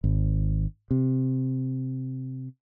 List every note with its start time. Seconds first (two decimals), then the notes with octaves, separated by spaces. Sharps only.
0.04 G#1
0.91 C3